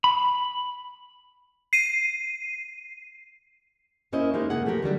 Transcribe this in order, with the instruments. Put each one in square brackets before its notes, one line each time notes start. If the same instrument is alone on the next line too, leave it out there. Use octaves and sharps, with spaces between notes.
[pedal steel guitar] B5
[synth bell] C7 D#7
[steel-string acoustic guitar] A#3 C#4 E4 A#4 C5 D#5
G#3 A#3 D#4 G4
C3 A#3 G#4 F#5
F3 A3 A#3 G4 A#4
D3 F#3 G3 D4